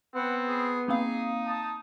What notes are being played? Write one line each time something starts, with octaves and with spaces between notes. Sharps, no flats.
B3 C4 F#5
G#4
A#3 C4 D#4 G#4 F5
A5 D#6